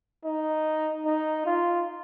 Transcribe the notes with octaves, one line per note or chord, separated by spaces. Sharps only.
D#4
D#4
F4